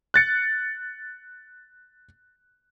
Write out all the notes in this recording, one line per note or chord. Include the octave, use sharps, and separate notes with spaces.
F#6 A6 C#7